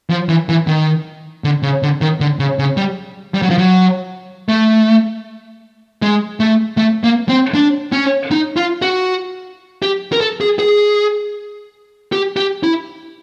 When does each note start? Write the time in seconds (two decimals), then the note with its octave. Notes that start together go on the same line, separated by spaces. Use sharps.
0.10 F3
0.29 E3
0.49 E3
0.67 D#3
1.44 D3
1.63 C#3
1.83 D3
2.01 D#3
2.20 D3
2.39 C#3
2.59 C#3
2.77 G3
3.34 G3
3.42 F#3
3.50 F3
3.58 F#3
4.49 A3
6.02 G#3
6.40 A3
6.77 A3
7.04 A#3
7.29 C4
7.54 D4
7.92 C#4
8.31 D#4
8.56 F4
8.82 F#4
9.83 G4
10.12 A#4
10.21 A4
10.41 G#4
10.59 G#4
12.12 G4
12.37 G4
12.63 E4